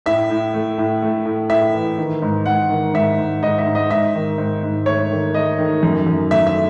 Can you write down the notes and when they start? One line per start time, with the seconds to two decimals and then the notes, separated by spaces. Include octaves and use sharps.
0.06 A2 E5
0.30 A2
0.54 A3
0.78 A2
1.02 A3
1.25 A2
1.50 A2 E5
1.74 E3
1.98 D#3
2.22 G#2
2.46 G#2 F#5
2.70 D#3
2.94 G#2 E5
3.18 G#2
3.43 G#2 D#5
3.58 E5
3.66 G#2
3.75 D#5
3.91 G#2 E5
4.15 D#3
4.38 G#2
4.63 G#2
4.86 A3 C#5
5.11 D#3
5.34 A3 D#5
5.59 D#3
5.83 F#2
6.07 F#2
6.31 A3 E5
6.47 E5